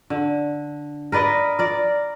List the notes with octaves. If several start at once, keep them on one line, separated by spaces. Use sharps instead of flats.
D3
A#4 B4 D5 D#5
A#4 D5